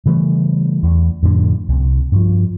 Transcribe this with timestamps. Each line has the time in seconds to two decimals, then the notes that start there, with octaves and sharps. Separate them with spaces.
0.06 C#3 E3 G3 A3
0.83 E2
1.23 F2 A2 D3
1.69 C2 C3
2.12 G2 F3